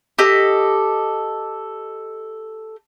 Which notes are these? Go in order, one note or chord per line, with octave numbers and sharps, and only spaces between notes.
G4 A4 D#5